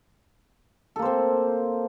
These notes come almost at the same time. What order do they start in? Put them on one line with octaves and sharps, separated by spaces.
A4 A#3 C5 C4